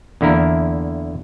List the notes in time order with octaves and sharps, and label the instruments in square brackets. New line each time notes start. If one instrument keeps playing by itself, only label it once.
[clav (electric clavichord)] E2 D3 A#3 E4 A#4